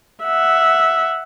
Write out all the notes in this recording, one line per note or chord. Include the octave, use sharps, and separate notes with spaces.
E5 F#5